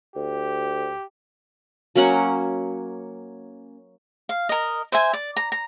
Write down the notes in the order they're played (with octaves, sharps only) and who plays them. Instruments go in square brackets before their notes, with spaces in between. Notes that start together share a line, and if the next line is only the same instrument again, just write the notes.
[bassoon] D2 [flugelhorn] G4
[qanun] F#3 A#3 C#4 F#5
[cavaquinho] F5
A#4 D#5
C5 E5 G#5
D5
A#5
A#5